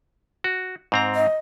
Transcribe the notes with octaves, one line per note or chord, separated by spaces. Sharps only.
F#4
G#2 C4 A#5
D#5